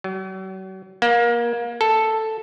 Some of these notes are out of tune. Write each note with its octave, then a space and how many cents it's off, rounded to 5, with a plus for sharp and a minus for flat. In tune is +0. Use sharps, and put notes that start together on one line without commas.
F#3 +40
A#3 +25
A4 +0